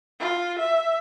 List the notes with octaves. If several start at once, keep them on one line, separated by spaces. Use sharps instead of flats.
F4
E5